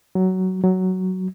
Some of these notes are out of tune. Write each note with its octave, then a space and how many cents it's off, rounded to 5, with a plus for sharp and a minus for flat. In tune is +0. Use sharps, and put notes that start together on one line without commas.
F#3 +15
F#3 +10